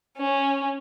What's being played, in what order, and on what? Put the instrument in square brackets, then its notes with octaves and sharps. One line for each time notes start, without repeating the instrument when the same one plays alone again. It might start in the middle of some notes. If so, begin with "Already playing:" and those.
[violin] C#4